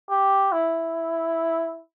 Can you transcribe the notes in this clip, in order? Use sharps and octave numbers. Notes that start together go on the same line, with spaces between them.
G4
E4